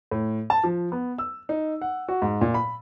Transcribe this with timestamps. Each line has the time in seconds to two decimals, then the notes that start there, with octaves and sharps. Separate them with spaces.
0.11 A2
0.50 A5
0.64 F3
0.92 B3
1.18 E6
1.49 D#4
1.81 F#5
2.08 F#4
2.22 G#2
2.41 A#2
2.54 B5